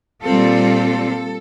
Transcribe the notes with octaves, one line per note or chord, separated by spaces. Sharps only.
A#2 G3 C4 F4 A4